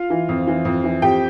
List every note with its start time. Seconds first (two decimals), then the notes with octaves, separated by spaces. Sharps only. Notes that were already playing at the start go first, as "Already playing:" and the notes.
Already playing: F4 F5
0.10 E3
0.29 F2
0.48 E3
0.65 F2
0.84 E3
1.02 F2 G4 G5